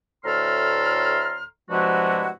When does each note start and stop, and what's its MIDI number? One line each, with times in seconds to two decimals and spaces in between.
0.24 1.44 38
0.24 1.44 45
0.24 1.44 69
0.24 1.44 82
0.24 1.44 84
0.24 1.44 89
1.70 2.28 43
1.70 2.28 48
1.70 2.28 53
1.70 2.28 56
1.70 2.28 64
1.70 2.28 66